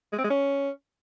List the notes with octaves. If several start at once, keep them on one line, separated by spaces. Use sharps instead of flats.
G#3
C4
G#3
C#4